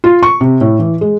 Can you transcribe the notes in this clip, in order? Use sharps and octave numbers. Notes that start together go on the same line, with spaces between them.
F4
C#6
C3
A2
E3
G#3